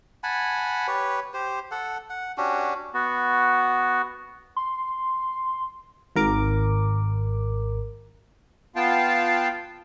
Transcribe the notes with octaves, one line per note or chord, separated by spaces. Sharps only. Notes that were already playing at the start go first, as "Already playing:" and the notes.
F#5 G#5 A5 B5
G4 B4 C#5
G4 C5
A4 F#5
F#5
C#4 D4 F#4 G4
B3 F#4
C6
G#1 A#4 D6
B3 F4 F5 G5 A5